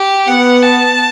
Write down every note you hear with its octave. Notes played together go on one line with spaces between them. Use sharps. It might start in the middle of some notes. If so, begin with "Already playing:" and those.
Already playing: G4
B3 F#5
A5